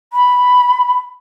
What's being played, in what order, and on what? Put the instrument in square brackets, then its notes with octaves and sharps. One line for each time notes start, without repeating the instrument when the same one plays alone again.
[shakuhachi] B5